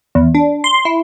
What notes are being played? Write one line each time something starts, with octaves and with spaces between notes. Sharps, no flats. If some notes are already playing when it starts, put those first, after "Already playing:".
E2
D4
C6
E4